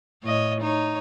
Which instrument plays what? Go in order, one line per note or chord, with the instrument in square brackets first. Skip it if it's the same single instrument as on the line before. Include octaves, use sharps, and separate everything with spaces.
[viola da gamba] A2 C#5 D#5
D#4 C#5